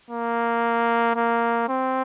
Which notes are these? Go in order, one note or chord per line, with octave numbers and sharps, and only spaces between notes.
A#3
A#3
C4